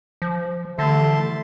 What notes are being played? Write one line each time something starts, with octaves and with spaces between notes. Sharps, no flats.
F3
D3 E3 G3 A3 E5 A5 C6